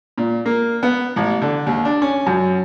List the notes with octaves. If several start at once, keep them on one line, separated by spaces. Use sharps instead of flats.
A#2
A#3
B3
A1
D3
D#2
D4
C#4
F#2